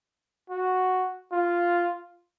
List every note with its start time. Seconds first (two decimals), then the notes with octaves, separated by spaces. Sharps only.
0.50 F#4
1.32 F4